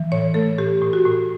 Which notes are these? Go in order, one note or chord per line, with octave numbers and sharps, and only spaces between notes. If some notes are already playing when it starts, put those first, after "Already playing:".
Already playing: E3
A2 C#5
A3 A4
A2 G4
A2
F#4
A2